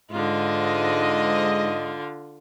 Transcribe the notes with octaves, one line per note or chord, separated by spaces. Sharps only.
G#2 D3 F4 D#5